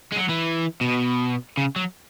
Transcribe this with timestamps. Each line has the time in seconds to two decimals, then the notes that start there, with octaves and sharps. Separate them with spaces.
0.13 G#3
0.17 F#3
0.30 E3
0.81 B2
1.57 C#3
1.76 F#3